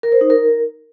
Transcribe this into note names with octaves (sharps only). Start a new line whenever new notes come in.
A#4
C5
D#4
A#4